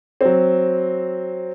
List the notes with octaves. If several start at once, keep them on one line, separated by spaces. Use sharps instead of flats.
F#3 C4